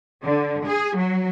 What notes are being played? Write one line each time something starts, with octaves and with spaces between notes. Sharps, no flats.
D3
G#4
F#3